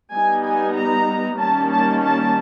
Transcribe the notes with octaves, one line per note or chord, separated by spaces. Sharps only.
G3 B3 D#4 G#5
G#5
A#5
D#3 G3 A#3 C#4 A5
A5
A5